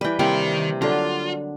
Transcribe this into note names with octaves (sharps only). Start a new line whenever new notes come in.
E3 G3 B4 G5
C3 D#3 E3 G3 A#3 C4 D4 G5
D3 F#3 D4 F4